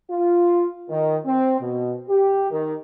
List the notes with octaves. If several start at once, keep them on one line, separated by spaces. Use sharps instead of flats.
F4
D#3
C4
B2
G4
D#3